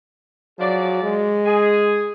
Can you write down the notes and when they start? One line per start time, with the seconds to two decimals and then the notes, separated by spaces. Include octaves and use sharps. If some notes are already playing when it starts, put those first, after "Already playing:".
0.60 F3 F#3 G#4 D5
1.04 G#3
1.46 G#4